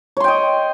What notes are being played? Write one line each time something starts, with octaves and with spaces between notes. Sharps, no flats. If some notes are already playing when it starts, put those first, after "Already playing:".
C#5 D#5 G5 C6